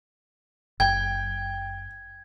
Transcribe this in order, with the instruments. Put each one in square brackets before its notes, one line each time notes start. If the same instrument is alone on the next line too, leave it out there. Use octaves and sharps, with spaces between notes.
[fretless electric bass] F#1 [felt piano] G5 [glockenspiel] G#6